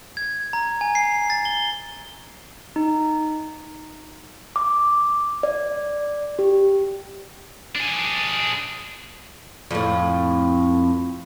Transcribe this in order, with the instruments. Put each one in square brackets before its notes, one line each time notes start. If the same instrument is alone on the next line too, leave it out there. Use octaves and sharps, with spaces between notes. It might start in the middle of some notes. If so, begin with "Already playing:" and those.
[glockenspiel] G#6
A#5
G#5
C7
A6
G7
[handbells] D#4
[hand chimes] D6
D5
G4
[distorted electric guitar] D4 G#4
[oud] F2 A2